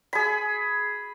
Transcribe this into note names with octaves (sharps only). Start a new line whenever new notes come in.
G#4 B5